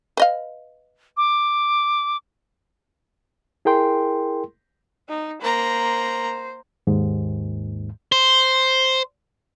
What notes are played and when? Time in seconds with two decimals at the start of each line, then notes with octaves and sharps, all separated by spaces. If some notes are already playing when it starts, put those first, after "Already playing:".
0.17 B4 D#5 F5
1.17 D6
3.65 E4 G#4 A#4 G5 C6
5.09 D#4
5.42 A#3 C5 A#5
6.87 D#2 G#2
8.12 C5